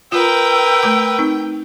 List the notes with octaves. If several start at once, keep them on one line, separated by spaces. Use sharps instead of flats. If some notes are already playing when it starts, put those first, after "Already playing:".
F4 A#4 B4 G5 E6
A3 D6
C4 D#4